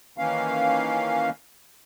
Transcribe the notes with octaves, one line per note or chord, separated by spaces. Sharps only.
D#3 E3 A#3 C#4 F5